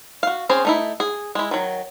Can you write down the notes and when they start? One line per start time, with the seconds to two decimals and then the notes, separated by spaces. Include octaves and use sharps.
0.23 F#4 F5
0.49 C4 C#4 G#4 C5
0.65 A3 D#4 E4
1.00 G#4
1.35 G#3 E4
1.51 D#3 F#3